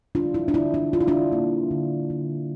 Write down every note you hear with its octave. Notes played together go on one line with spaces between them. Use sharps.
G3 D4 F4
E4
D4
D3 E4
D4
G3 F4
E4
D4 F4
A#3
D3
D3